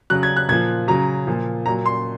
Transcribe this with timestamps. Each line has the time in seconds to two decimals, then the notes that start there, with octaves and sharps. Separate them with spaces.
0.10 C#3 F#3 F#6
0.23 G#6
0.36 F#6
0.49 A#2 F3 G#6
0.88 C#3 F#3 A#5
1.27 A#2 F3
1.66 A#2 F#3 A#5
1.86 C6